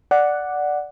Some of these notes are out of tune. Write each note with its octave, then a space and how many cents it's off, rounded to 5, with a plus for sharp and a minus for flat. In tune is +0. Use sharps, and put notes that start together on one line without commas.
D5 +0 F#5 +0